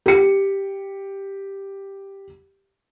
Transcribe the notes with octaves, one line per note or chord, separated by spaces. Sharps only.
G4 C#7